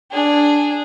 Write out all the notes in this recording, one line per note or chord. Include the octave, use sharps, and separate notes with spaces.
D4 G#4